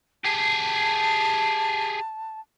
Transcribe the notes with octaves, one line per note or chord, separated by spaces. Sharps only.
G4 G#4 A5